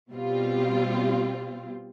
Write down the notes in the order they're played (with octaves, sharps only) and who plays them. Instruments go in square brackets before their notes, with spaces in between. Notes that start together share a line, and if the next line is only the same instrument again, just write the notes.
[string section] B2 G3 C4 F4